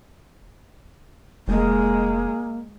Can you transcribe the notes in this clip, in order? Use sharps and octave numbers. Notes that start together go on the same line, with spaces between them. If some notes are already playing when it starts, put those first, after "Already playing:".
F1 G#3 A#3